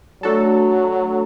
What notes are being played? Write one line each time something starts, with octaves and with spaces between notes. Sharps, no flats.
F#3 A3 D4 F#4 A4